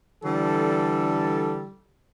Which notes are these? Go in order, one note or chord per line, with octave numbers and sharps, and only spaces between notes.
D3 E3 G3 A4